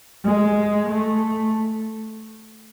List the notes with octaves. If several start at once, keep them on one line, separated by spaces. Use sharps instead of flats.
G#3
A3